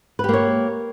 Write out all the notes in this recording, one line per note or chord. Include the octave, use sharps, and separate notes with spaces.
A#3 G4 B4 C#5